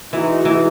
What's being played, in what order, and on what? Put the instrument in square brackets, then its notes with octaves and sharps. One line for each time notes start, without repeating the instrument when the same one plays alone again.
[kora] E3 [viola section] G#3 D#4 F#4
[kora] E3